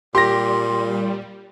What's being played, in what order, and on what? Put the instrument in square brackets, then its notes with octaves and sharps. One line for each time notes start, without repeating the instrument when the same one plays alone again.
[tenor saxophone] A#2 [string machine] G3 [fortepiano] G4 [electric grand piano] C6 A#6